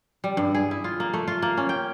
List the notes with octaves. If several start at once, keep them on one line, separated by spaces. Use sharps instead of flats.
G3
G2
G#4
E4
F4
A#3
A3
F4
A#3
C#4
G5